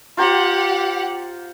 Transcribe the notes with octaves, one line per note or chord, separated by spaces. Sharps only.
F4 G4 C5 F#5 A#5